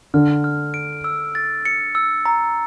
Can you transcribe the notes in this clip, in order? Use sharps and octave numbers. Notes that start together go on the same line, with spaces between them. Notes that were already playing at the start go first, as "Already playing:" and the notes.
D3 F6
F6
D7
E6
A6
C#7
E6
A#5